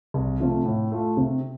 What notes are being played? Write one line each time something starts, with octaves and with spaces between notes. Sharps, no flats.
C2
C3 F3 A3 F4
A2
A3 F4
C3